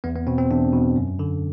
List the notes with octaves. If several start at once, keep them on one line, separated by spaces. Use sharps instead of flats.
E2 B3
B3
B2 C4
C4
E2 D4
B2
F#2
D3